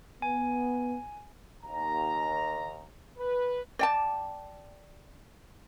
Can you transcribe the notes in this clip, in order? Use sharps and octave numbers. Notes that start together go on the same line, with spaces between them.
B3 G#5
D#2 A#5
B4
D5 G5 A5